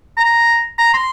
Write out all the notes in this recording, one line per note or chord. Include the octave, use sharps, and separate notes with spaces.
A#5
A#5
C6